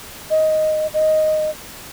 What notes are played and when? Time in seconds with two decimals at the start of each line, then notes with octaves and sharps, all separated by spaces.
0.30 D#5
0.94 D#5